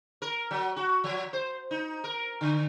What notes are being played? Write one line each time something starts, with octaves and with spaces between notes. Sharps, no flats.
A#4
F#3
F#4
F3
C5
D#4
A#4
D3